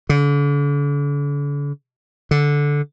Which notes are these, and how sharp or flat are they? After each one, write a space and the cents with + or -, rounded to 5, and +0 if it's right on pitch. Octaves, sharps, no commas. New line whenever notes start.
D3 -40
D3 -10